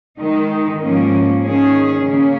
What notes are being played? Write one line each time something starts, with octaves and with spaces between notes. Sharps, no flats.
D#3 G#3 D#4
G#2 F3 A#3 C#4
D#3 C#4 G#4
C#3 A#3 C#4